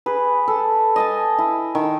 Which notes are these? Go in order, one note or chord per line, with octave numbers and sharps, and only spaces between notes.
G#4 B4
A4
D#5 G#5 A5
E4
D#3